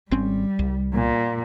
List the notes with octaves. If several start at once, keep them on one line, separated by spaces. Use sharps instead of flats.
G#1 G3 C4 C#4
C2
A#2